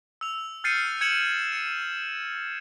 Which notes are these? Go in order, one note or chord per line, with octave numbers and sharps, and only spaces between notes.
E6 F7
F6 G6 A6 C7 C#7 D#7
G#6 C#7 E7 F#7
C#7 E7